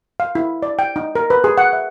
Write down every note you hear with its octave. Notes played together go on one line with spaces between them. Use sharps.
F5
E4
D5
G5
D#4
A#4
B4
G#4
F#5
E5